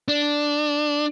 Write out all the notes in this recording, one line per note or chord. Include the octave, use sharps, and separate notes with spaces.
D4